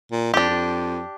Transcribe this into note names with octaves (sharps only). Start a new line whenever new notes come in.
A#2
F2 D4 G4
F2